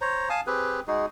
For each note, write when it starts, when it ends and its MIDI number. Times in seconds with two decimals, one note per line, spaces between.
0.01 0.29 72
0.01 0.29 73
0.01 0.29 82
0.29 0.41 77
0.29 0.41 80
0.29 0.41 81
0.29 0.41 87
0.47 0.80 60
0.47 0.80 67
0.47 0.80 68
0.47 0.80 71
0.87 1.06 56
0.87 1.06 63
0.87 1.06 66
0.87 1.06 68